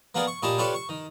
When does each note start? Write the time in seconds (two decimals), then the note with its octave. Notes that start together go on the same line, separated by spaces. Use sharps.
0.15 A#3 B3 G#4 A#4 D5
0.27 C#6
0.42 A#2 D#4 G4 G#5 A5 B5
0.58 D4 F4 G4 A4 B4 C#5
0.74 C#6
0.89 D#3